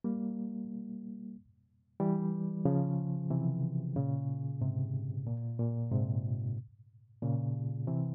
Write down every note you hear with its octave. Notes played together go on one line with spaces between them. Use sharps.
G3 A#3
E3 G3
C#3 F3
C3 E3
A#2 C#3
G#2 C3
A#2
A#2
G#2 C3
A#2 C#3
C3 E3